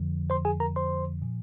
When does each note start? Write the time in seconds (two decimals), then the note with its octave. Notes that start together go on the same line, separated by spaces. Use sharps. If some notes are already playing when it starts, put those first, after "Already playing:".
Already playing: F2 D3 F3
0.30 C5 C6
0.45 G#4 G#5
0.60 A#4 A#5
0.76 C5 C6
1.22 A#2 F3